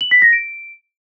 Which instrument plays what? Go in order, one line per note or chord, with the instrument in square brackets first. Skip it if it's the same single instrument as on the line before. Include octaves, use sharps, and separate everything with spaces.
[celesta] F#7
B6
A#6
D7